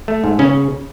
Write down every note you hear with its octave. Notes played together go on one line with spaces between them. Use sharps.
A3
G#2
C#3 C#4